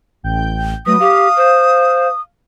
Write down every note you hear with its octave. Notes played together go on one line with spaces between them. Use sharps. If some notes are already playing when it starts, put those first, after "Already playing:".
A1 G5 G6
F#3 A3 B4 D#6 A#6
G4 F5
C5